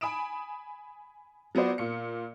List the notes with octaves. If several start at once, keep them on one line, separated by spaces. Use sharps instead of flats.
G#5 B5 D#6 D7 E7
F#3 B3 F4 F#4 C5 D5
A#2 C#7